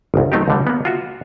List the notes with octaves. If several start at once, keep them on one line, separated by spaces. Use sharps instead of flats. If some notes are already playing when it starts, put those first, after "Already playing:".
G1 C2
F#3 A3 C4 D#4 F4 G4
C#2 D3 G3
A#3 B3
F4 F#4 E5